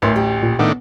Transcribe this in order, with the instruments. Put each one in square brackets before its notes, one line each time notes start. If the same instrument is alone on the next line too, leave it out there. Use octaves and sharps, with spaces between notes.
[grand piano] A1 D2 [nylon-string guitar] E4 A#4 [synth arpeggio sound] B4 E5 C6
[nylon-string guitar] G4 G5
[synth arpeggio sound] A#2
[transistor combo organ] A2 D#3 D4 [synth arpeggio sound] B3